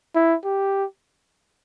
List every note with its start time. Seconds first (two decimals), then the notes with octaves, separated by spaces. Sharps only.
0.15 E4
0.44 G4